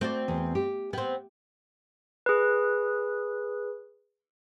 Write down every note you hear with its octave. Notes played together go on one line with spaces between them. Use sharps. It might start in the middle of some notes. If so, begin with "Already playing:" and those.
A3 C4 F#4 D5
E2
G4
B3 C4 G5
G#4 B4